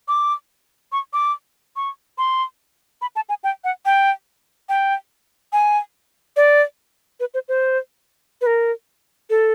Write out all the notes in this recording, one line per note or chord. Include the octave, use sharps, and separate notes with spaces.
D6
C#6
D6
C#6
C6
B5
A5
G#5
G5
F#5
G5
G5
G#5
D5
B4
C5
C5
B4
A#4
A4